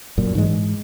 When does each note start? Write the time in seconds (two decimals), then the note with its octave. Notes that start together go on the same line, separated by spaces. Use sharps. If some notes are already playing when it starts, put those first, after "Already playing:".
0.17 F#1 F#2 A#2
0.35 G#2 E3 G#3